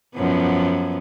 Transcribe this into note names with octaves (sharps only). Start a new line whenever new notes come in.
F#2 F3 B3